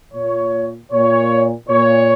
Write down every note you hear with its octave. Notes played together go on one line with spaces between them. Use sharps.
A#2 C#5
A#2 C#5
A#2 C#5